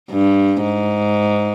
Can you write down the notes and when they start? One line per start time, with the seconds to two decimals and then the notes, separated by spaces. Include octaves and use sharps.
0.11 G2
0.63 G#2